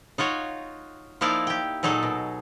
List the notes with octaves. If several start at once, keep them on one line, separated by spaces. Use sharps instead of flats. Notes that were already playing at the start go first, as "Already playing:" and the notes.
D#4 F4 F#4 C#5
F3 A#3 D#4 E4 D5 F5
G4 G5
A#2 F#3 D#4 G#4 A4
B2